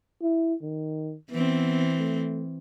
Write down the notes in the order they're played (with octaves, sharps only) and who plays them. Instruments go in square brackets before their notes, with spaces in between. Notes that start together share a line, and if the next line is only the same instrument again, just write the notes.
[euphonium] E4
D#3
[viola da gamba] E3 C4 [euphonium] B3
[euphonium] A3